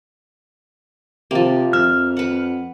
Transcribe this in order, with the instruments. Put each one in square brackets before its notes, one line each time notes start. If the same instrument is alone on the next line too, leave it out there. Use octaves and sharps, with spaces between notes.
[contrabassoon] C3 [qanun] F3 A#3
[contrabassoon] F2 [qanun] E5 [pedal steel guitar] F6
[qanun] B4 F#5